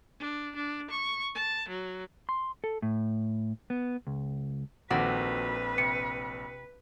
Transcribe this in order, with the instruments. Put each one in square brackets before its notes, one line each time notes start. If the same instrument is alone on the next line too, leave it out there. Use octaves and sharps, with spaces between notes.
[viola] D4
D4
C#6
A5
F#3
[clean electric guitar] C6
A4
A2
B3
C#2
[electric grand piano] A#1 C4 A4 [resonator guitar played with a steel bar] D#3 A#3 F#4 [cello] B4
[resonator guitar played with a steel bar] C3 [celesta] C#7